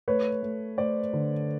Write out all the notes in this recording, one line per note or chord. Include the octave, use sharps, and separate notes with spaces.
A3 B4 C#5
A3
A3 C5 D5
D3